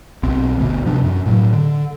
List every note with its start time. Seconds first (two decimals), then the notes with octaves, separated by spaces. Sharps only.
0.23 B1 C4
0.57 G1 D2 B2
0.86 C3 F3 D4
1.03 F#2
1.26 A2 F#3
1.53 D3